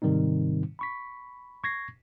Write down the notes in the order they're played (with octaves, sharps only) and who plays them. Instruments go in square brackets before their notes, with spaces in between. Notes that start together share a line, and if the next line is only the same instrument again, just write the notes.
[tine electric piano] G#2 C3 D#3 G3 C4 D#4
B5 C#6 B6
C#6 G#6 A#6 C7